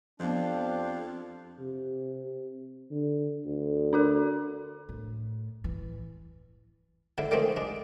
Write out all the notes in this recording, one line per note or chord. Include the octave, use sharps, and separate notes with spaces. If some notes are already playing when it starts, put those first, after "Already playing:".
F2 F3 B3 D4 G4 C5 F5
C3
D3
D2
D4 F#4 A#4
A2
E3
G#2 D3 E4
D3 D#3 F3 G#3 A3 C4
G#3 D4